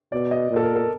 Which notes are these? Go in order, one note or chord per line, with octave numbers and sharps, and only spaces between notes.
B2 D5
D#5
A#2
A4
A#4
A4